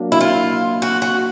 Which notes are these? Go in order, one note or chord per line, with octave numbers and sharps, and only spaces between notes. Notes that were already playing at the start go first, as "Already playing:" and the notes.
Already playing: F#3 A#3 D4
E4
F4
F#4
F#4